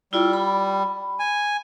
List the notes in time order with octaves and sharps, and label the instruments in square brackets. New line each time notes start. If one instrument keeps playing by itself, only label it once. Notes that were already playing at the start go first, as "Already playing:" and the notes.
[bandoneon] G3 [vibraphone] E4 F4 D5
[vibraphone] B5
[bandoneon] G#5